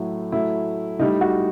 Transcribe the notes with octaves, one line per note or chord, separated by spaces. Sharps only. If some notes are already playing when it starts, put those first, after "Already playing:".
Already playing: A2 F#3 A3
A2 F#3 A3 E4
A2 G3 D#4
F#4